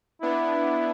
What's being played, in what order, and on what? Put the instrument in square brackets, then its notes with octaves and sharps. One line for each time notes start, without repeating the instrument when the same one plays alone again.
[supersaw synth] B3 D4 [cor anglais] E4